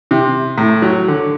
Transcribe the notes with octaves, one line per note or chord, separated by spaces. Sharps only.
C3
A2
F#3
D3